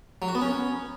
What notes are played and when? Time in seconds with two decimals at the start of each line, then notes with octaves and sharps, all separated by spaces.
0.22 F#3
0.28 F#4
0.35 B3
0.42 C#4